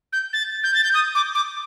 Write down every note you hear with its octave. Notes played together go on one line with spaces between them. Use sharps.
G6
A6
G6
A6
G6
D#6
D6
D6